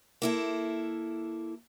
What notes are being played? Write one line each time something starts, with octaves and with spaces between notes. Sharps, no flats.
A#3 E4 A4